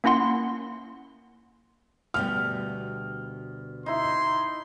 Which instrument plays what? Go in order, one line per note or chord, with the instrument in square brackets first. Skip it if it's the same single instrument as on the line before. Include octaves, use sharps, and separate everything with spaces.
[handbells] A#3 C#4 E4 F#5 C6
[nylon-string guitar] D2 B2 G3 [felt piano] F6
[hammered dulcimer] D#4 E4 E5 [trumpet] C6